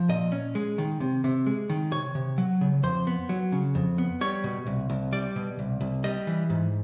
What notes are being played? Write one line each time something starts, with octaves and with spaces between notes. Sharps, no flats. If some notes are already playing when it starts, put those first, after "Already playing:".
Already playing: F3
A#2 D#5
C#4
G#3
D#3
C3
C3
G#3
D#3
C3 C#5
C3
F#3
C#3
F2 C5
B3
F#3
C#3
F2
B3
G3 C#5
B2
C2
C2
G3 D5
B2
C2
C2
G3 D#5
E3
G#2